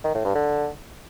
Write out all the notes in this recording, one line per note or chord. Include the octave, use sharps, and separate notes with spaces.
D#3
A2
G2
D3